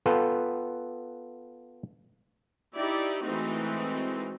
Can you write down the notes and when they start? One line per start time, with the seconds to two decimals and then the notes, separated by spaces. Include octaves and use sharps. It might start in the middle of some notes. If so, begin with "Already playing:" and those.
0.06 B3 F4 A4 B4 G5
2.74 D#4 E4 G4 D5
3.22 E3 G#3 A3 C4 D#4 F#4